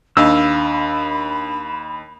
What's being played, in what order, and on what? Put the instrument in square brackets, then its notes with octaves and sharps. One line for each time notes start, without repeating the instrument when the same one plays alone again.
[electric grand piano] D#2 D#5 F5 [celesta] D4 [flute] B5 [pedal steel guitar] E6